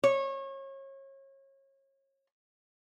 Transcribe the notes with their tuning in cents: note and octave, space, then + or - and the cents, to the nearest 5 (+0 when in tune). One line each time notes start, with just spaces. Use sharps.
C#5 -30